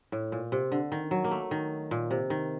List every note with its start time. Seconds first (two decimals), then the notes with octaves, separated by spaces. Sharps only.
0.12 A2
0.32 A#2
0.52 C3
0.72 D3
0.92 D#3
1.11 F#3
1.24 A#3
1.31 A3
1.51 D#3
1.91 A#2
2.11 C3
2.30 D#3